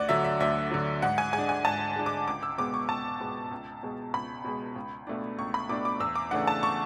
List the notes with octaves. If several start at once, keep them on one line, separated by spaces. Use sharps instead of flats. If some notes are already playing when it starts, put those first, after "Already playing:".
Already playing: D2 D5 F#5
D3 F#3 E5
E5
D2 E5
D3 F#3
G#2 F#5
G#5
G#3 G#5
D4
G#5
G#2 A5
G#3 D4
D6
C#2 D6
E6
B2 G#3 B3 D6
C#6
C#2 A5
B2 G#3 B3
C#2
B2 G#3
C#2 B5
B2 G#3
C#2
B2 A3 D4
C#2 C#6
B5
B2 A3 D4 D6
D6
E2 E6
D6
C#3 E3 A3 D4 F#5
A5
C#6